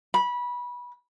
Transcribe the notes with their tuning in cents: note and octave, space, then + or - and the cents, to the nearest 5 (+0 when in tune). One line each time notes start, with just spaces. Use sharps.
B5 -20